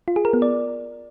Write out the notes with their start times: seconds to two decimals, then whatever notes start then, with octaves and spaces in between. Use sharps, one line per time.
0.08 F4
0.16 G#4
0.25 A#4
0.33 B3
0.42 D5